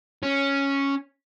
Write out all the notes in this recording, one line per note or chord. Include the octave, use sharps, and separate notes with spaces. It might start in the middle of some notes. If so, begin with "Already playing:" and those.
C#4